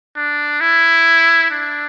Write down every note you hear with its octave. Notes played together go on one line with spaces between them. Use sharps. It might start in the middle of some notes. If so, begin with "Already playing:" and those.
D4
E4
D4